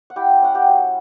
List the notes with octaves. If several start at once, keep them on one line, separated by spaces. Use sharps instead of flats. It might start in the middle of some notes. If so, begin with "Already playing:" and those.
F#5
E4 G4 G5
C#4 F#5
G4 G5
F#3